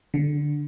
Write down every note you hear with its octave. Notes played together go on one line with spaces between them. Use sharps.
D3